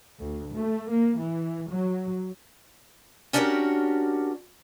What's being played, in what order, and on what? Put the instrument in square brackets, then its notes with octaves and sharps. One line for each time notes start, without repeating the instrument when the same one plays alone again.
[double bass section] D2
A3
A#3
E3
F#3
[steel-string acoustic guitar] C#4 D4 F#4 G4 A#4 C#5